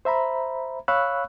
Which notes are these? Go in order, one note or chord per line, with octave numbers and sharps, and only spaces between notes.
C5 E5 A#5 B5
C#5 F5 B5 C#6 E6 F#6